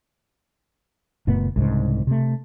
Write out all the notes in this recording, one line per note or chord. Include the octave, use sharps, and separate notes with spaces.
F#1 A#2 A3 B3
C2 G#2 C#3
C3 A3